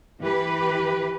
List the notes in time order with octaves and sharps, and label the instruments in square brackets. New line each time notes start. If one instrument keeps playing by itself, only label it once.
[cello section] E3 G4 B4